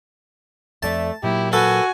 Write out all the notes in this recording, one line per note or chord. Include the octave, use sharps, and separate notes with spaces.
F2 A3 D5 E5 A5
A#2 F#3 A#3 E4 G4
F#4 A4 B4 G#5